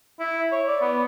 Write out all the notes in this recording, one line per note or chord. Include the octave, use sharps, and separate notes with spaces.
E4
C#5
D5
B3